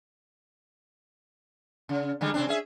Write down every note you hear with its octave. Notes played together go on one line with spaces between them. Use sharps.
C#3
D3 G3 G#3
C3 C4 D4
C#4 G#4 E5